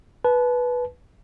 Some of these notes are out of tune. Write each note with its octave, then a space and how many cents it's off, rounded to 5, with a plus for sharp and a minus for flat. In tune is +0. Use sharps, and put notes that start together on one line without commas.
B4 -5 A5 -30